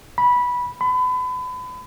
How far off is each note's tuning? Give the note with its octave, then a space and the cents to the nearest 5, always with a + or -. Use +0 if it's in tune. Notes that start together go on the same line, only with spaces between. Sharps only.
B5 -15
B5 +30